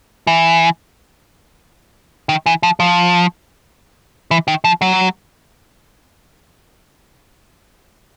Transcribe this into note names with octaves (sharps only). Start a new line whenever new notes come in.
E3
D#3
E3
F3
F3
E3
D#3
F3
F#3